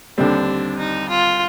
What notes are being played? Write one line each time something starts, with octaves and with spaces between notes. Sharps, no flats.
D#2 D3 G3 C4 D4
D#4
F4